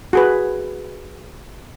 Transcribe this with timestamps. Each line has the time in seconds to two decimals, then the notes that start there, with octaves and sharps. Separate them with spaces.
0.13 F#4 G#4 B4